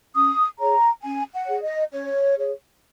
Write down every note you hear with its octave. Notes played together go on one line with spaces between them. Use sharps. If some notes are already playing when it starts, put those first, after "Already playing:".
C#4 D#6
G#4 C#5 A#5
C#4 G#5
F#5
G#4 C#5
D#5
C#4 C#5
G#4 C#5